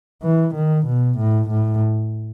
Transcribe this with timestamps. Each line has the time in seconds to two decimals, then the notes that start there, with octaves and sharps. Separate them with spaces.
0.22 E3
0.55 D#3
0.87 B2
1.18 A2
1.50 A2